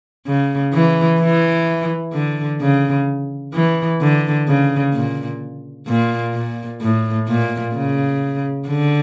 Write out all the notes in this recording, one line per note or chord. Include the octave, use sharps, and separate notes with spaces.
C#3
E3
E3
D3
C#3
E3
D3
C#3
A#2
A#2
A#2
A2
A#2
C#3
D3